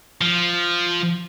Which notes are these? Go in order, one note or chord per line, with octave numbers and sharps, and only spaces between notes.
F3